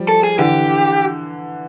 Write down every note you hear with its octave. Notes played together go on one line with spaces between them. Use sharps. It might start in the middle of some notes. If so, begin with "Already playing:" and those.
Already playing: F3 G3
A4
G#4
D3 E3 G4